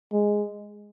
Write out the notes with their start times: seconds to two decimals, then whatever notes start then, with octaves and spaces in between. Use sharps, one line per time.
0.12 G#3